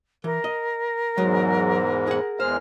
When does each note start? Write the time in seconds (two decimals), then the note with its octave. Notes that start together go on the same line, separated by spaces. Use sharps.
0.24 E3 A#4
0.44 D#5
1.18 E2 G#2 F#3 G#3
2.08 G#4 F#5
2.40 E2 G#3 C5 F6